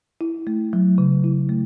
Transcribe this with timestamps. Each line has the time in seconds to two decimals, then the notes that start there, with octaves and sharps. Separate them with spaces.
0.21 E4
0.47 A3
0.73 F#3
0.98 C#3
1.24 E4
1.49 A3